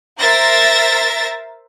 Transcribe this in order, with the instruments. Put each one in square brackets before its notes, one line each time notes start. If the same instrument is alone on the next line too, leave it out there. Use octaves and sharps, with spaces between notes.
[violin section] A#4 C5 E5 A6 A#6